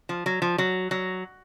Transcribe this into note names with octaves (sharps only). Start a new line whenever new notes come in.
F3
F#3
F3
F#3
F#3